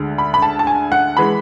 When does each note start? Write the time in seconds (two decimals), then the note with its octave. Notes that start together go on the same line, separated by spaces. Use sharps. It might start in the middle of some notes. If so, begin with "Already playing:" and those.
Already playing: D2 D3 G#3
0.18 B5
0.34 B5
0.42 A5
0.59 A5
0.67 G#5
0.92 F#5
1.17 E3 G#3 B5